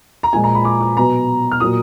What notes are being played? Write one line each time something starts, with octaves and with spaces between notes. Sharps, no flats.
A#5
A#2 F3 G#3 G#5
A#5
B5
D6
D6
B2 F#3 B3 A#5
F6
A#2 F#3 A#3 D#6